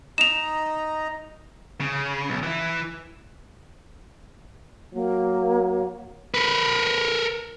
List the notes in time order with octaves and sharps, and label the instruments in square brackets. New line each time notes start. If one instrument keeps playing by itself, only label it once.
[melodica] D#4 D#5 A#5 [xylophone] E7 F7
[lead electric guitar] C#3
B1
E3 E4
[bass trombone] F#3 [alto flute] A#3
[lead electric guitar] A#4 B4